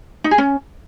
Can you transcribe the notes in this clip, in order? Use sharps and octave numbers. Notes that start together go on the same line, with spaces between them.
D#4
G#4
C#4